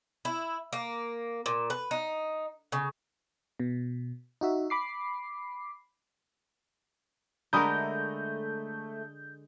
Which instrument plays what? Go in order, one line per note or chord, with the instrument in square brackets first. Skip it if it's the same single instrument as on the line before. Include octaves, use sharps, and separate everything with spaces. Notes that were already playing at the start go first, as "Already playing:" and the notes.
[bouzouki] E4
A#3
A#2
B4
D#4
C#3
[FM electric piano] B2
D#4 F#4 E5
B5 D6 C7
[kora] D3 G#3 A#4 [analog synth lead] A3 [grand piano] A#5 B5 D#6 [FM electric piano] G6